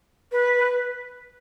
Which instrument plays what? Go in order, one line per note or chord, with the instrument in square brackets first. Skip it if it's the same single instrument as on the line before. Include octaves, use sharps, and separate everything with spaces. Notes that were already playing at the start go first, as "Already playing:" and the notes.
[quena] B4